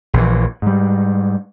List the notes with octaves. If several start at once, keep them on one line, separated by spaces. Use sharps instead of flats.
A#1 E3
G#2 G3